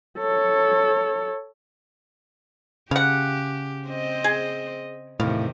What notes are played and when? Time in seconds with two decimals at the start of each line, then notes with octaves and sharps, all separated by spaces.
0.18 A4 C#5
2.91 C#3 G4 F5 F#5
3.88 C4 C5 D#5
4.24 G#4
5.20 E2 A2 C3 D#3 F5